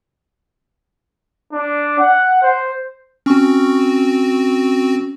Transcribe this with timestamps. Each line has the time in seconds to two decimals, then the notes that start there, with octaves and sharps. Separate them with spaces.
1.52 D4
1.99 F#5
2.43 C5
3.26 C4 C#4 F#4 C#6